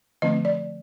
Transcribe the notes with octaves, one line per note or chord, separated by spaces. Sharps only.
D3 F3 A3 C4 D#5
D5